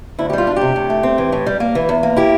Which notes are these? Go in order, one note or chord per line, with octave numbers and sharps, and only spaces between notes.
D2 E4
G4
G3 F4
D4
C3 G4
A2
A3
C4
E3
A2
G3
A#3
E3
E2
A#3
E4 G4